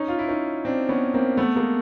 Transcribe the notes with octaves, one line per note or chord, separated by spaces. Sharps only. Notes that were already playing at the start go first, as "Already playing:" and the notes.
Already playing: C#4 D#4
F4
E4
C#4 D#4
C4 D4
B3 C#4
A#3 C4
A3 B3
G#3 A#3